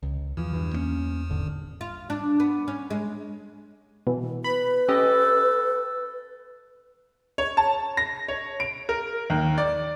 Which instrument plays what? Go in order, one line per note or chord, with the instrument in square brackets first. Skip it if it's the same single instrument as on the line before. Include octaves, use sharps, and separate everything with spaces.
[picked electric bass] C#2
[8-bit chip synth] E2 [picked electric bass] E3 F3
[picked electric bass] G2 E3
A#3 C#4
D#1 G#1 D3
[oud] F4
D4
B3
C#4
G#3
[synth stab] B2 E3
[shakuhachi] B4 [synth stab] B5
[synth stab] C#4 G4 D#5 [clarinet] A4
[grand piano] C#5
A5
A#6
C#5
D7
A#4
D#2
D5